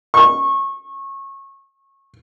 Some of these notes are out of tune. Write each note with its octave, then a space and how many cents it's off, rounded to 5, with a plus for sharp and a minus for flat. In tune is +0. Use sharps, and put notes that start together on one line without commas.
C#6 -25